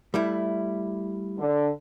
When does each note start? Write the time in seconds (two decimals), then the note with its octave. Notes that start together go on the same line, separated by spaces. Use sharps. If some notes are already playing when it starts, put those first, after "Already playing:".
0.14 G3 A3 E4
1.39 D3